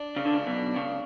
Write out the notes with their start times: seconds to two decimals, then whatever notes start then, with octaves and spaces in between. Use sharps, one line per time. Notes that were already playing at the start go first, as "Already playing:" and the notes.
Already playing: D4
0.16 C#3
0.25 D3
0.33 C#2 C#3
0.46 B1 B2
0.76 C#2 C#3